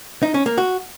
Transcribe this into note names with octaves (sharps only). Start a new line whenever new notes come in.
D#4
C#4
A#3
F#4